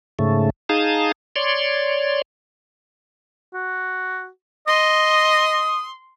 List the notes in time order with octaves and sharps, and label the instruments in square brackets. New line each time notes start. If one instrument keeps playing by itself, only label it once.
[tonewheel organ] G#2 C#3 A3
D#4 G#4 F5 A5 D#6
C#5 D5 C6
[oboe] F#4
[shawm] D#5 [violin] C6 [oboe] D#6